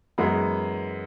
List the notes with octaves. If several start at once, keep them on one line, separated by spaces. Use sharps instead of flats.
F#2 E3 G#3 B3